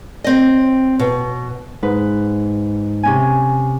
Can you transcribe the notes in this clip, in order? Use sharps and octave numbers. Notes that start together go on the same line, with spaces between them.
C4 D#5
B2
G#2 B4
C3 C#4 G#5